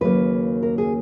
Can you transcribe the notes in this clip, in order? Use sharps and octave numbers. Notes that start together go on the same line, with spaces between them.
D#2 C#3 F#3 A#3 B4
A#4
G#4